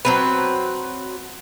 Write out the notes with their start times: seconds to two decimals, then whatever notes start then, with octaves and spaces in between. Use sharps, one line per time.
0.05 F#3 C4 B4